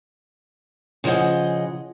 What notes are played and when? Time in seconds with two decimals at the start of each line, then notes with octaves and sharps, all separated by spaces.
1.04 C#3 F3 G#4 D#5 F#5